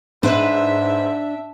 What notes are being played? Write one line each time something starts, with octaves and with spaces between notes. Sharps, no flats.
G#2 D4 B4 C5 E5